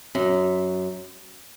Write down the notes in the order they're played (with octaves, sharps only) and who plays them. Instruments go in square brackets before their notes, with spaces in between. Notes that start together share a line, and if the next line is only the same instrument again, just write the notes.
[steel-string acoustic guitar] F#2